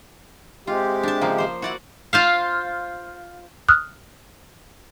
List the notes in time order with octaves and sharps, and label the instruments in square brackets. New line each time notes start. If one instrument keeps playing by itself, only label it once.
[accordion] C3 G#3 G4 [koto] F4
[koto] D4 A5
C#3 F3 A#3
F3 C5
[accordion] E4 [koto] F#4 D5 F#5
[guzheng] F4 C5 F5
[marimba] D#6 F6 F#6